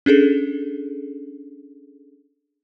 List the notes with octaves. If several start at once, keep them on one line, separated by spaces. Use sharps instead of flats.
C#4 D4 G#4 A4